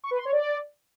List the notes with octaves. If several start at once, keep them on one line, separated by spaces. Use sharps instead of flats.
C#6
B4
C6
C#5
D5